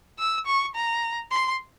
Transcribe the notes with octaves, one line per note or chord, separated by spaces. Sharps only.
E6
C#6
A#5
C6